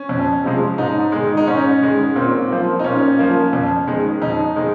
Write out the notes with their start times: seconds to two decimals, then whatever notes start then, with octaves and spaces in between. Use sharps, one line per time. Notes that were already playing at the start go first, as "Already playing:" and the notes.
Already playing: C#4
0.09 F2
0.44 C3 F3 G#3
0.78 G#2 D#4
1.12 D#3 G#3
1.37 D#4
1.47 G#2 C#4
1.82 D#3 G#3
2.16 A#2 C4
2.50 F3 A#3
2.79 D#4
2.84 A#2 C#4
3.19 F3 A#3
3.53 F2
3.87 D#3 G#3
4.22 F2 D#4
4.56 D#3 G#3